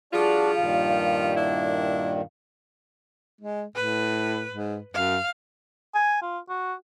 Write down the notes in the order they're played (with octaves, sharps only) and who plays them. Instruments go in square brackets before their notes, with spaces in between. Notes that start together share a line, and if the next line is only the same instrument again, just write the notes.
[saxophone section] F3 G3 F4 [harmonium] D4 F#4 D5 [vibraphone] G#4
[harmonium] G2 A#2 D#3 [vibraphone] F5
[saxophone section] D4 E4
[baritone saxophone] G#3
[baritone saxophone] A2 [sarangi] B4
[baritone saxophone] G#2
[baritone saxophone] F#2 [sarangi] F5
[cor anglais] G#5
F4
F#4